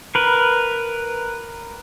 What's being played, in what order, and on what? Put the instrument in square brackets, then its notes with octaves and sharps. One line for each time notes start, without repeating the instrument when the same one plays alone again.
[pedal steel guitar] A#4 B4